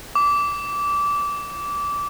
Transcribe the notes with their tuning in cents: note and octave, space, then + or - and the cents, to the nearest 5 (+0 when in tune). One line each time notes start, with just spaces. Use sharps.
D6 -20